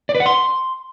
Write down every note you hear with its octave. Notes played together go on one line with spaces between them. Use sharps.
D5
B4
F#5
C6